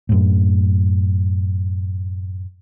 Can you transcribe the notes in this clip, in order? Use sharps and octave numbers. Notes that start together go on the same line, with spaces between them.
F#2 A2